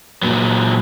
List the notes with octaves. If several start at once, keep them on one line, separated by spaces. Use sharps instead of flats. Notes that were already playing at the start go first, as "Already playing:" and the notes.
A#2 F#3